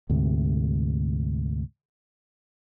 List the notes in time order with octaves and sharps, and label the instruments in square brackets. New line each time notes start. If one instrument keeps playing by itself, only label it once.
[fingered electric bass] D2 G#2 C3